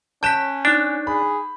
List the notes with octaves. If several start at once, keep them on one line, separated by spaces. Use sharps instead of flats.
C#4 A5 F#6 G6 B6 E7
D4 D#4 F#6
G#4 B5